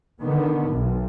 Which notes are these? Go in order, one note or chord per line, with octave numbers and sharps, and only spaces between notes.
D3 D#3 B3
B1